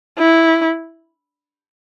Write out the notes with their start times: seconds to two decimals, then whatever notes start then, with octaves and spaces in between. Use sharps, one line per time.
0.18 E4